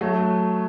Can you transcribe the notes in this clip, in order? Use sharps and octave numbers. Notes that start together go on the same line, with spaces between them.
F#3 A3